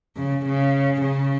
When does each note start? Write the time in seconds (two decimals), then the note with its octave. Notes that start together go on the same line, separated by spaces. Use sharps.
0.16 C#3
0.45 C#3
1.01 C#3